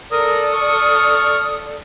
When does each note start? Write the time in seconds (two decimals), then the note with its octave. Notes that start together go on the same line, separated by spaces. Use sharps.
0.11 A4 A#4 D5 D#6
0.53 C#6 F6